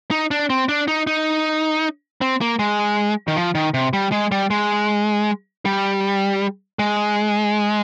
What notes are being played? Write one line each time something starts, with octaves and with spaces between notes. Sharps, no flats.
D#4
D4
C4
D4
D#4
D#4
C4
A#3
G#3
D#3
F3
D#3
C3
G3
G#3
G3
G#3
G3
G#3